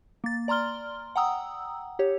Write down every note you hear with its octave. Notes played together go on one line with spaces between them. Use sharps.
A#3 A6
D5 A#5 C6 F6 G7
F#5 G5 A#5 D#6 E6
G4 C#5